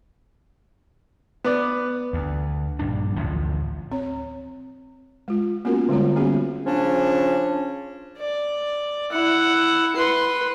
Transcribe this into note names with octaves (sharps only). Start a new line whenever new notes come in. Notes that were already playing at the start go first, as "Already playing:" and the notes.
B3 B4 D5
D2
A#1 G2 D4
A1 D2 A2 F3
C4 C#5
G#3 F4
A#3 B3 C#4 F4 F#4 A#4
D3 G3 G#3 C4 F4 C#5
G3 A#3 B3 C#4 F#4 G#4
C#3 F3 C#4 D4
D5
E4 F#5
B4 C6